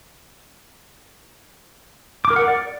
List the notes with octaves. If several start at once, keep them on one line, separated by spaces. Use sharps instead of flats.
D6
A#4
F#5
A#4
D5